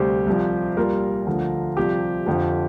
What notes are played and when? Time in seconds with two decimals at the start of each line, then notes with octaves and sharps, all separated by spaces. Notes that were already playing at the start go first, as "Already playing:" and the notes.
Already playing: D2 C3 G3 G4 C5
0.26 C2 C3 F3
0.77 C2 A#2 G3 F4 A#4
1.27 D2 D3 F3
1.77 C2 C3 F3 G4
2.26 F2 D3 F3